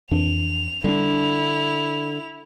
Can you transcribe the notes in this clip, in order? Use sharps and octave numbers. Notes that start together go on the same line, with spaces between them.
F2 E3 D4 F7
D3 G3 C#4 D4 E4 F7